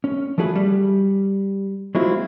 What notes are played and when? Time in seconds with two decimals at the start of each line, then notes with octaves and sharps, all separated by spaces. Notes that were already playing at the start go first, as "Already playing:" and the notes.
0.04 C#4
0.38 F3 F#3 A3 G#4 B4
0.55 G3
1.95 F#3 G#3 C4 E4 F4